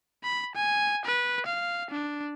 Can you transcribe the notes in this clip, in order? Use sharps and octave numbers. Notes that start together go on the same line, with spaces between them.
B5
G#5
B4
F5
D4